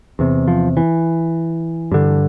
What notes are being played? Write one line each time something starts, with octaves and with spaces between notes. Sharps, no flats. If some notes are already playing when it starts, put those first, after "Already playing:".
E2 C3
F3
E3
G2 D3